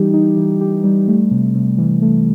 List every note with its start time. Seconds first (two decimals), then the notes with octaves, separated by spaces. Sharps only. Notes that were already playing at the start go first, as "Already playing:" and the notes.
Already playing: E3 G3 D#4 G4
0.14 D#4
0.37 E3
0.61 G4
0.84 G3
1.08 A3
1.31 C3
1.55 C3
1.78 E3
2.02 A3